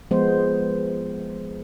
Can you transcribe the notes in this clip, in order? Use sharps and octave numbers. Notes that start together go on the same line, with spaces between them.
F3 G#3 B3 C5